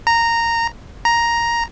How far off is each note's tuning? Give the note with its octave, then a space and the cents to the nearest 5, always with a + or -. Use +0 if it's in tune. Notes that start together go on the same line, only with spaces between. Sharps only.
A#5 -10
A#5 +5